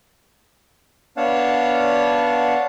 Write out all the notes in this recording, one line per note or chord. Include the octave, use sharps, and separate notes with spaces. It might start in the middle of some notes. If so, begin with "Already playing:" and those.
B3 D4 C#5 F5 F#5 A5